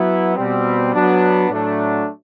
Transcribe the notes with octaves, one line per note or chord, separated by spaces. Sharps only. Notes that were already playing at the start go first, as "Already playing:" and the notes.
Already playing: F#3 B3 E4
B2 G3 C4
F#3 B3 D4
A2 F#3 A3 D4